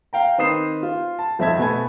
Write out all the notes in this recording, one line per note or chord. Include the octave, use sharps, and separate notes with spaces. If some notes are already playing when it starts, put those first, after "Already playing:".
F5 G5 A#5
D#3 C4 B4 D#6 C7 E7
F4
A5
B1 F2 C4 E5 A5 G#6
B2 A3 B3 A4 G#5 G#6